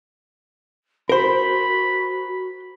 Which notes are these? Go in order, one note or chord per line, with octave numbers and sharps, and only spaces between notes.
F#4 A#4 C5 B5